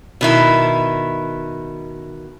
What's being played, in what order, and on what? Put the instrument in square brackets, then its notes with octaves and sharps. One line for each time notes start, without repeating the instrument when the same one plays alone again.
[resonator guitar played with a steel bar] B2 D#3 E4